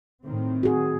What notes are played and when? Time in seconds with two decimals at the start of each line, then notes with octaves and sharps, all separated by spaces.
0.23 A2 D#3 C4
0.63 F#4 G#4